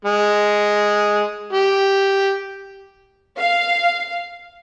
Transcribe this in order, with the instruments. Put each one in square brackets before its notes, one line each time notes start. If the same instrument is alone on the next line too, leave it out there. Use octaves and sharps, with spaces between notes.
[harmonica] G#3
G4
[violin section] F5